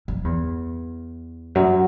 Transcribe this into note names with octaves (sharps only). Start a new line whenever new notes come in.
F#2
E2
F#2